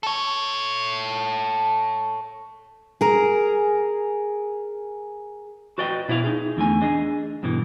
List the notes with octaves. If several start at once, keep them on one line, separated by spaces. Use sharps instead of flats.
A4 C#5
G#4 A#4
F#4 B4 D5 D#5 G5
B2 E4 B4 C5 F5
D#4 G#4
E2 D3 A3 G#5
D4 G#4 D#5
G2 B2 D3 E3